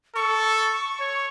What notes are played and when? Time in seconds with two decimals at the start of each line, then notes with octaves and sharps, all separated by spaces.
0.16 A4 C#6
1.00 C#5